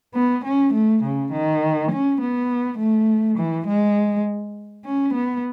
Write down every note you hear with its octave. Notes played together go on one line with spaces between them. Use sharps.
B3
C#4
A3
C#3
D#3
C#4
B3
A3
E3
G#3
C#4
B3